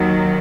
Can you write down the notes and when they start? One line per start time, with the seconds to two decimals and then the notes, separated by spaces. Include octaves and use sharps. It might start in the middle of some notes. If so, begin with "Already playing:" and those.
Already playing: D#2 D#3 F#3